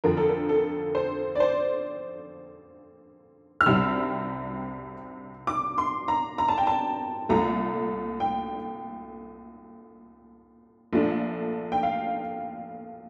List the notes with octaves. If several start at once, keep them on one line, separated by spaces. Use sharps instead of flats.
F2 D3 F3 A#4
A4
A#4
A4
C5
D5
C5
F6
C2 C3 G3 C4 E4 E6
D6
C6
A#5
A#5
A5
G5
A5
C2 A#2 A3 A#5
G5
A#1 A#2 A3 D4
G5
F5